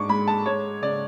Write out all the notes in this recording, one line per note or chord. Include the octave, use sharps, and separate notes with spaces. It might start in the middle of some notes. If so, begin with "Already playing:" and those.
Already playing: G#2 D4 C#6 D6
G#3 B5
A5
G#3 C#5
C#3 D5